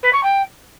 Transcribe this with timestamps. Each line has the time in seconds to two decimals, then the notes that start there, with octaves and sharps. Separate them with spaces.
0.03 B4
0.13 C#6
0.23 G5